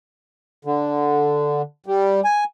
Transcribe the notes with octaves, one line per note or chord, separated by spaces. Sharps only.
D3
G3
G#5